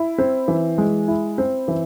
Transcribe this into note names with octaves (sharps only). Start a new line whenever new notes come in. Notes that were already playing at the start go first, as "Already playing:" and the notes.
Already playing: E4
C4
E3
G#3
E4
C4
E3